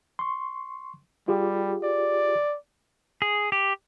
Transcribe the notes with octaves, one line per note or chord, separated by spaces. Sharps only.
C6 C#6
G3 F4 G4 G#4
D5
G#4
G4